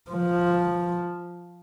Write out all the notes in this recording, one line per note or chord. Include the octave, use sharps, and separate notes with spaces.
F3